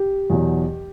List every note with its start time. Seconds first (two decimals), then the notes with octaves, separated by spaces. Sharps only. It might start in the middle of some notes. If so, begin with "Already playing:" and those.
Already playing: G4
0.30 E2 B2 F#3